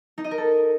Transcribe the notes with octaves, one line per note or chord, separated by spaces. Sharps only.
D#4
D#5
A#4
A4